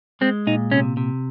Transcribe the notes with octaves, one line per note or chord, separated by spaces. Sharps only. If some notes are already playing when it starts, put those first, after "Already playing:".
G#3 C4
A#2 D#4
C3 C#4
C3